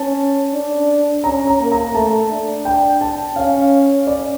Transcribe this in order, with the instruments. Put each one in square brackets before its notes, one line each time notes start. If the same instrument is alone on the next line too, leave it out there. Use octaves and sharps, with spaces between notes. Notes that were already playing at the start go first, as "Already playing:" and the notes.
Already playing: [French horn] C#4 [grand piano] A5
[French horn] D4
[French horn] C#4 [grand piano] A#5
[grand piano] A#5
[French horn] A#3
[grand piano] A#5
[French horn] A3 [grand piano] A5
[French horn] D4
[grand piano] G5
A5
[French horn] C#4 [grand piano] F5
[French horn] C#4 [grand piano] D5